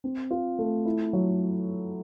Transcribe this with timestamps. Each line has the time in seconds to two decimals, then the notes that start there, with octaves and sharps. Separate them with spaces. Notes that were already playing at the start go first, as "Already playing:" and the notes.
0.04 C4
0.31 F4
0.59 A3
0.86 E4
1.13 F#3